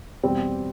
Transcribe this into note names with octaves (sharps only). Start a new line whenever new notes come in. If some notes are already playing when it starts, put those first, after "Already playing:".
E2 B2 G3 C4